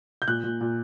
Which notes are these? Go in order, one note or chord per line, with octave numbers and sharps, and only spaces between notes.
G6
A#2 F#6
A#2
A#2